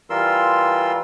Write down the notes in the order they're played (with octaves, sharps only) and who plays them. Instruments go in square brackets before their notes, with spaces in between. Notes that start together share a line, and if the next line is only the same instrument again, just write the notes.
[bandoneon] E3 G3 F4 A#4 C6 E6